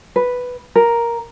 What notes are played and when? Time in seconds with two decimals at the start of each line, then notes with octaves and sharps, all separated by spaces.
0.16 B4
0.75 A#4